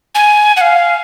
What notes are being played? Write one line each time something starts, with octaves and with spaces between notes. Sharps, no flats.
G#5
F#5
F5